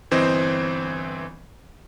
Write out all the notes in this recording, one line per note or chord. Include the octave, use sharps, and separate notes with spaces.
G1 E3 C4 C5 D#5